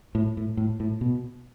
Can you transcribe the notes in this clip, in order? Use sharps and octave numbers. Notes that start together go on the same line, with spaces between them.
A2
A2
A2
A2
B2